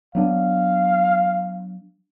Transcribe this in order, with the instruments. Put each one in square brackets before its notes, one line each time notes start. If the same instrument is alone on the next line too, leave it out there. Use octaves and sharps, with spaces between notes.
[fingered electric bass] F#3 B3 D4 [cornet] F5